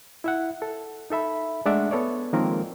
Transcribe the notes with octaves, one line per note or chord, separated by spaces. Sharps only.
E4 E5 F#5
A4
D#4 A4 E5 B5
G#3 A3 D4 D5 E5 F#5
B3 A4 C#5 D5
D#3 F3 G#3 A#3 C4 A#4